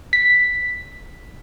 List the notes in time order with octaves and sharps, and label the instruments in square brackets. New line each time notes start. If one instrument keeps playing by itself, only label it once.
[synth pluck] B6